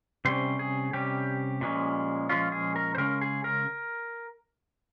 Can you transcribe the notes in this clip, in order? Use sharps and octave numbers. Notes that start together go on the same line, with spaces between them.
C3 G3 C#4 C5
G#4
C3 G3 C#4 G4
A#2 F3 G#3 C#4
A#2 F3 G#3 C#4 F4
G#4
A#4
C5
C#3 G#3 C#4 A#4
G#4
A#4